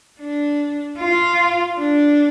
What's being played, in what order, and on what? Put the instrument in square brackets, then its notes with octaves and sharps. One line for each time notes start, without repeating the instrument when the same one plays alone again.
[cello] D4
F4
D4